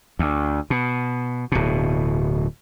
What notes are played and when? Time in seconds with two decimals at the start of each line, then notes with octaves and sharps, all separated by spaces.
0.19 D2
0.70 B2
1.52 D1 B2